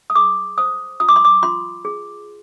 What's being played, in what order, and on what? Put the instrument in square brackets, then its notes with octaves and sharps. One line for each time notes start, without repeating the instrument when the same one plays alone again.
[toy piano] D#6
G#4 D6
C5 D#6
F4 D#6
D6
C6
D6
F4 C6
G#4